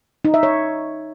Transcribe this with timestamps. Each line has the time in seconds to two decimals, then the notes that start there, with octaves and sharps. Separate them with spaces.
0.25 D#4
0.34 E5
0.43 C#5